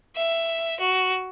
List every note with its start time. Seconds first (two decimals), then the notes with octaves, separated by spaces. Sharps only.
0.16 E5
0.80 F#4